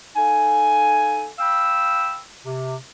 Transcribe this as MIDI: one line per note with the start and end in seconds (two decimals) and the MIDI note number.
0.16 1.28 63
0.16 1.28 69
0.16 1.28 77
0.16 1.28 80
1.38 2.20 77
1.38 2.20 79
1.38 2.20 83
1.38 2.20 88
2.45 2.74 48